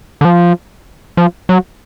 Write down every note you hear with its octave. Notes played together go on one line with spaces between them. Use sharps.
D3
F3
F3
F#3